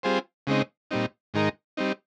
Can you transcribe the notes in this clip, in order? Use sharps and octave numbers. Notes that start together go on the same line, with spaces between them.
G3 C4 F4 G#4 C5
C#3 G#3 C4 D#4
A#2 G3 C4 D#4
G#2 D#3 G#3 D#4 A#4
G3 C4 D#4